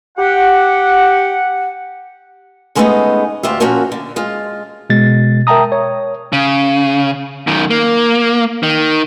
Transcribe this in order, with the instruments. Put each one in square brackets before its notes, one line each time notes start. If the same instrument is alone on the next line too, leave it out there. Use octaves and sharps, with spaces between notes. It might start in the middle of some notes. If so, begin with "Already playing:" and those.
[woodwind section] G4 F#5
[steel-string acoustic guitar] C#3 G#3 A3 B3 D4 D#4
D2 F4 G4 E5
A#2 F3 C#4 F#4 A#4
D3
G#3 F4
[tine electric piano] B2 G#3 A6
A#4 E5 G5 A5 A#5 D#6
C#5
[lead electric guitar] C#3
F#2 D#3
A#3
D#3